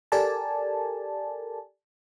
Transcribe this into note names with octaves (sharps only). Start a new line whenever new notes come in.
G4 A4 A#4 D5 G#5 A5